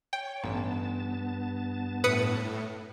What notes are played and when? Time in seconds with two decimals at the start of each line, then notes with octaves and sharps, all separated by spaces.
0.13 C#5 G5
0.44 A1 G2 B3 A5
2.04 A2 B4 D#6 C#7